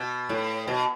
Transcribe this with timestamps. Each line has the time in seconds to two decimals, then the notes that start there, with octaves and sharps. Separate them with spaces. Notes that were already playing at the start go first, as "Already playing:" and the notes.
Already playing: B2
0.29 A2
0.67 B2